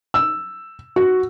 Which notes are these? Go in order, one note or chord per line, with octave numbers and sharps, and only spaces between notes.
E6
F#4